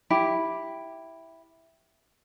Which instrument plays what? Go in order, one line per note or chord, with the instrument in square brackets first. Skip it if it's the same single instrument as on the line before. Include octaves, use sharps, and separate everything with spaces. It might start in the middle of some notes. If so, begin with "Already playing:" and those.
[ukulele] E4 G4